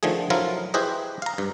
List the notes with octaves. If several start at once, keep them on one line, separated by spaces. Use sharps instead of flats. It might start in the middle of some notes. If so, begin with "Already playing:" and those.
D3 D#3 F3 A3 G#4
F3 F#3 E4 F4 A#4
E4 G4 G#4 B4 C5 D#5
F5 A#5
G2